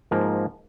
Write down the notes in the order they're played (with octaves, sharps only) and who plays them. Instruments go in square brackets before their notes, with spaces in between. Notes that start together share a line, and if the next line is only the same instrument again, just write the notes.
[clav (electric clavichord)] G#2 F3 A#3